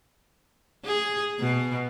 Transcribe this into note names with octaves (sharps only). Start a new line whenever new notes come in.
G#4
B2